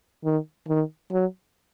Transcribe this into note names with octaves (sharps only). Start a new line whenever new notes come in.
D#3
D#3
F#3